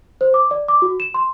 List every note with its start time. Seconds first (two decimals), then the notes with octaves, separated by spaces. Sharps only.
0.21 C5
0.34 D6
0.51 D5
0.68 D6
0.82 F#4
1.00 E7
1.14 C6